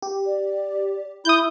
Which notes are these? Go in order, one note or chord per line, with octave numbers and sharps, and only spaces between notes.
G4
D5
E4 B5 D#6 G6